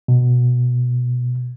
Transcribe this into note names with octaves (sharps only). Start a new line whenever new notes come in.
B2